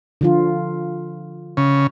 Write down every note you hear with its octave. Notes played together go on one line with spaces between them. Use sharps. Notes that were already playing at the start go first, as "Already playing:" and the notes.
D3 F3 F4
C#3